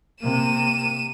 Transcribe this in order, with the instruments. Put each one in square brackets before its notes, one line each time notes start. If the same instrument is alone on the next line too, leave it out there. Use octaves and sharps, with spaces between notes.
[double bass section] C3 A#3 [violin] D#7 E7